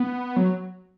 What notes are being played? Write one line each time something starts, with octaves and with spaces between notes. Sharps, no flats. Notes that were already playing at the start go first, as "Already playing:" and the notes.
Already playing: B3
F#3